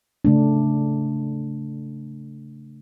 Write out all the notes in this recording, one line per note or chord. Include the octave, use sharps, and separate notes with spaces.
C#3 A3 D4